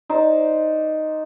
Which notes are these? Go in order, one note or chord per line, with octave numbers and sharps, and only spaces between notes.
D#4 C5 D5